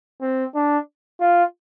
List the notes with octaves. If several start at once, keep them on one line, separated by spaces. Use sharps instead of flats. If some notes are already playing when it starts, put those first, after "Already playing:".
C4
D4
F4